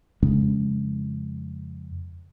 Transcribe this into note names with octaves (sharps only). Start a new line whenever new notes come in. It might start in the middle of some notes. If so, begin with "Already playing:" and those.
F2 C#3 G#3 C#4